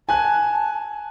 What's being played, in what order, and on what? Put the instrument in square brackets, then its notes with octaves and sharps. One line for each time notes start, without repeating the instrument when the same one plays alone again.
[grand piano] G#5 F#6 [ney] A5